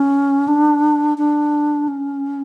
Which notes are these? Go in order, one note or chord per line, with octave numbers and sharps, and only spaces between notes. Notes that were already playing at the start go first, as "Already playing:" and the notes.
Already playing: C#4
D4
D4
C#4